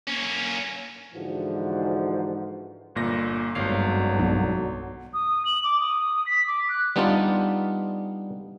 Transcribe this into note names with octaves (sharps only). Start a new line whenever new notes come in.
A#3 C#4
G#2 D3 E3 F3 F#4
G1 A#2 A#6
G#1 G2 B2 D3 F#3 F5 C7
B1
D#6
F#7
D6
D#6
B6
D6
F#6
G3 B3 D4 D#4 F4